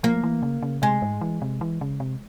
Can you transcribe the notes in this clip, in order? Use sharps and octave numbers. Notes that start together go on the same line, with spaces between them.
F3 A#3
E3
C#3
C#3
C3 G#3
G#2
E3
C3
E3
C#3
C3